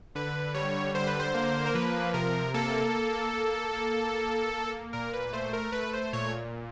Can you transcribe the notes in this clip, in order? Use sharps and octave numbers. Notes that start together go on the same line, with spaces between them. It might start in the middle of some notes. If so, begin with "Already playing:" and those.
D3 B4
G3 C#5
D3 C5
B4
C5
A#3
A#4
F3 B4
C3 A#4
A#3 A4
A#3
A#3
A#3
A#3
A#3
A#2 A#4
B4
A3 C5
A#4
A3 B4
C5
A#2 C#5